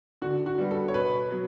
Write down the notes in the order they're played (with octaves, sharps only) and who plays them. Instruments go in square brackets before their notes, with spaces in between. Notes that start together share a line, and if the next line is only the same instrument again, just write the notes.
[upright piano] D3 [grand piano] F#4
[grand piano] F#4
[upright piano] G3 B3 F#4
[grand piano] A4
C#5
[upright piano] B2 [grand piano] B4
[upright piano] F#3 B3